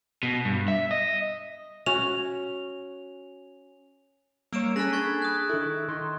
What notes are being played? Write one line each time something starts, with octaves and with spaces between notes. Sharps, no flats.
B2
G2
E5
D#5
C#4 F#4 F7
G3 A#3 C#5 E6 D7 E7
C#4 G#4 A4 B5 F#6 A#6
D4 C#6 G#6 A6
D#6 F#6
D#3 E4 A4
D#3 C6